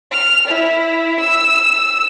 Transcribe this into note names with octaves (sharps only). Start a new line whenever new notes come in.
F6
E4
E6